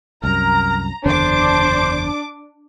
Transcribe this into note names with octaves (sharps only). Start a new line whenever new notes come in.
C2 F#2 A#4 A#5
F#1 E2 D3 D4 C5 D6